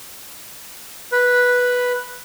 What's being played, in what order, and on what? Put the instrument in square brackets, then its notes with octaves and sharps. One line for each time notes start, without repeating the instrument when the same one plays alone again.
[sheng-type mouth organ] B4